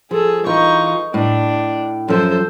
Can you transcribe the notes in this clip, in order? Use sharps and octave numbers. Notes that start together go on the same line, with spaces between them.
F3 G#4 A4
E3 D#4 F4 C#6
A2 D4
F#2 F3 A4 C5